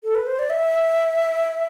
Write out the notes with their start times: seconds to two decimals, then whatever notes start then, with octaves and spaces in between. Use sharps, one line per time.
0.04 A4
0.15 B4
0.27 C5
0.39 D5
0.50 E5